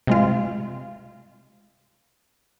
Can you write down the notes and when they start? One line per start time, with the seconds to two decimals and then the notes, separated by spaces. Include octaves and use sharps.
0.07 C3 G#3 F4